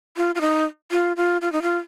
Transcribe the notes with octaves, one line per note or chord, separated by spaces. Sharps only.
F4
F4
D#4
F4
F4
F4
D#4
F4